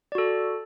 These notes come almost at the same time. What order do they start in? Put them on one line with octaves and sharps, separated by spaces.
D5 F#4 A4